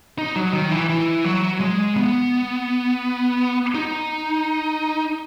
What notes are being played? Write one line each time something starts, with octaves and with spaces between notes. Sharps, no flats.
D#4
F#3
D#3
E3
E3
F#3
G#3
B3
D#4